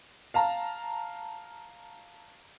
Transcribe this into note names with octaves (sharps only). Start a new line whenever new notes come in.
F5 A5 A#5